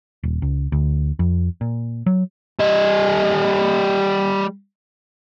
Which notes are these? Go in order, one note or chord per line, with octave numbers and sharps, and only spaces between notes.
D#1
C#2
D2
F2
A#2
F#3
G3 D#5